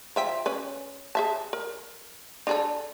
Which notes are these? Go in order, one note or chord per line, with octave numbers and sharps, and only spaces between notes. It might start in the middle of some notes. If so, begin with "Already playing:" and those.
F3 E5 G5
C#4 B4
G#4 E5 A5
A#4
D4 G#4 A4